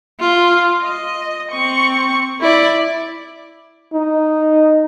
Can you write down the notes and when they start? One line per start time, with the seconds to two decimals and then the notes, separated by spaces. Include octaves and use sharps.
0.19 F4
0.83 D#5
1.51 C4 C#6
2.41 E4 D5
3.93 D#4